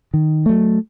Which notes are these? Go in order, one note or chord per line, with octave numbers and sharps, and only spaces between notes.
D#3
F#3 A3